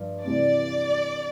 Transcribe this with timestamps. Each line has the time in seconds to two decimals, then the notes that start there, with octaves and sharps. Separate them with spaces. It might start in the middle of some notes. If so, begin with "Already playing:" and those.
Already playing: G2 F3
0.24 C3 E3 G3 D5